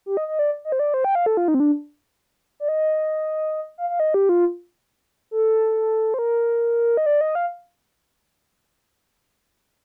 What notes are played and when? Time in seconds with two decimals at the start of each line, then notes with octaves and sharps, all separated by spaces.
0.06 G4
0.17 D#5
0.28 D#5
0.39 D5
0.65 D#5
0.72 C5
0.79 D5
0.94 C5
1.05 G5
1.15 F5
1.26 A4
1.37 F4
1.48 D#4
1.54 C4
1.60 D4
2.60 D5
2.68 D#5
3.78 F5
3.90 F5
4.00 D#5
4.14 G4
4.29 F4
5.31 A4
6.14 C5
6.19 A#4
6.97 D#5
7.06 D5
7.21 D#5
7.35 F5